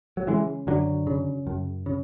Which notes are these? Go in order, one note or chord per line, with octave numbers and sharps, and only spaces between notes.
F#3
C#3 E3 G#3
F#2 D3 F#3
C#3
F#2
C#3